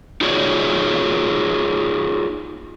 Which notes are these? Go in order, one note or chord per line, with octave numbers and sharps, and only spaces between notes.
D#4 F4 F#4 G#4 C#5 D5